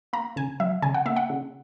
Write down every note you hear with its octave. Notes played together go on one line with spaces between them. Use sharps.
A#3 A#5
C#3 G#5
F#3 E5
C#3 G#5
F#5
A#3 E5
F#5
C#3